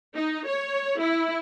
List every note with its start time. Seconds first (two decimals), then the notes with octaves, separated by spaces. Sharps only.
0.16 D#4
0.47 C#5
1.01 E4